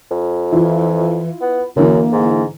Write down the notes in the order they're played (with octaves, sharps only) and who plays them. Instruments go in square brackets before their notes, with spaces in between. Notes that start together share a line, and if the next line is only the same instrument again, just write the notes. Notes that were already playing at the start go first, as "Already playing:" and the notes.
[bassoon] F2
[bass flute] E3 [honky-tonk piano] E4 F4
[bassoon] B3
[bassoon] F#2 [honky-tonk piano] D3 E3 [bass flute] A#3
[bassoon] G#2